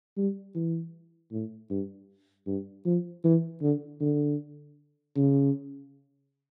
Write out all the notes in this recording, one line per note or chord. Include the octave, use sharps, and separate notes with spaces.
G3
E3
A2
G2
G2
F3
E3
D3
D3
C#3